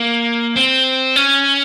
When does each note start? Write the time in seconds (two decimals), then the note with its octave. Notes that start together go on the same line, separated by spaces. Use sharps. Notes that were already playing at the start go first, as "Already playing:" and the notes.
Already playing: A#3
0.56 C4
1.16 C#4